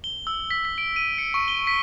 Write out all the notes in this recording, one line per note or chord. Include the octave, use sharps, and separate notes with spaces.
G7
E6
B6
B6
D7
D#7
C#7
C#6
G7
B6